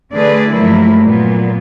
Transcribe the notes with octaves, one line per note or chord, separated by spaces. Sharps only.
D3 A3 G#4 B4 D5
G2 F3 F#3 A3 A#3 E4
A#2 F#3 B3